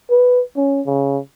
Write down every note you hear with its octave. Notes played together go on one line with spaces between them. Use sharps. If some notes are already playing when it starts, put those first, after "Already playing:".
B4
C#4
C#3